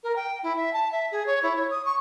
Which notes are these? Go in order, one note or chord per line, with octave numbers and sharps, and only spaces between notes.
A#4
G5
E4
E5
A5
E5
G#4
C#5
E4
C#5
D#6
C#6